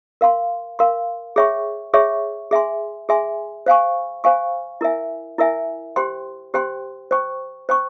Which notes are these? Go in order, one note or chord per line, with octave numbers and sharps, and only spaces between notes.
A#4 F5 C6
A#4 F5 C6
G#4 C#5 E5 G5 C#6
G#4 C#5 E5 G5 C#6
G#4 E5 G#5 C6
G#4 E5 G#5 C6
C5 F5 G#5 C#6
C5 F5 G#5 C#6
E4 A#4 E5 G#5
E4 A#4 E5 G#5
G4 C5 G5 C6
G4 C5 G5 C6
C5 G5 C#6
C5 G5 C#6